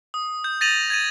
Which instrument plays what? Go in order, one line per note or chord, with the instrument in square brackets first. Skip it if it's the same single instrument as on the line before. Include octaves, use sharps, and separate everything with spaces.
[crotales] D#6
G6
A6 A#6 D#7 F7 F#7
G#6 A6 D#7